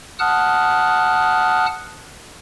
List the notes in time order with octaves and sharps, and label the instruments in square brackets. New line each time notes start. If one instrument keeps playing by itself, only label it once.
[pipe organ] F#5 A5 D#6 F6 F#6